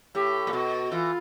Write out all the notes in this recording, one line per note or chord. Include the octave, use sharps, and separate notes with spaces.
A2 G4
A#2
B2 F#4
E3 F4